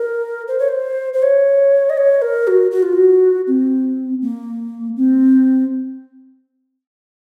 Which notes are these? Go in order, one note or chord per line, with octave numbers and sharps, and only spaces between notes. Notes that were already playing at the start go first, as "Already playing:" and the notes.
Already playing: A#4
C5
C#5
C5
C5
C#5
D#5
C#5
A#4
F#4
F#4
F4
F#4
C4
A#3
C4